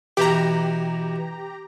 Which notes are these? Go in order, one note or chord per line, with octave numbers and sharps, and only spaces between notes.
B2 E3 G4 A#5 B5